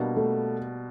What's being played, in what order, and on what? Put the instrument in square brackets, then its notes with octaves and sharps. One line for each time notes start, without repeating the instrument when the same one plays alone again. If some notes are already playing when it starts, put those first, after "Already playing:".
Already playing: [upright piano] B2 G3 A#3 D4
[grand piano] A3